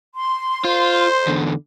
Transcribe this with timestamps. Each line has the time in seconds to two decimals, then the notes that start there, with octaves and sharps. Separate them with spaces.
0.15 C6
0.64 F4 C5
1.27 E2 D3